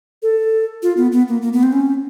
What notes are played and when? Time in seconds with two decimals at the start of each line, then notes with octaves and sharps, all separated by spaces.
0.22 A4
0.82 F4
0.97 B3
1.12 B3
1.28 A#3
1.42 A#3
1.53 B3
1.63 C4
1.72 C#4